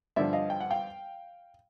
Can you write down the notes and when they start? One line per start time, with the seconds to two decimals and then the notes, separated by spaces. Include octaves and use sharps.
0.16 G2 D3 F3 D5 E5
0.33 D#5 F5
0.50 G5
0.60 F#5
0.71 F5 G5